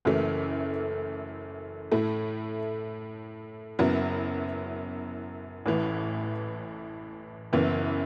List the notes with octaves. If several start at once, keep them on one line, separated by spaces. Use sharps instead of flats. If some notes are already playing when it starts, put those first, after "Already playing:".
F#1 F#2 E3 A3
A2 A3 E4
F#1 F#2 F#3 B3 E4
A1 A2 E3
F#1 F#2 E3 B3